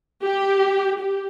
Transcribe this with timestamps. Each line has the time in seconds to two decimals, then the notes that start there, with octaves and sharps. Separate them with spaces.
0.23 G4
0.99 G4